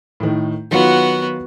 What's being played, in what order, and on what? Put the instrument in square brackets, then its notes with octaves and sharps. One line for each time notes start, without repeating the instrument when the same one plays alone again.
[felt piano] A2 D#3
[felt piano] D#3 F#3 F4 [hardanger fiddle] B3 F#4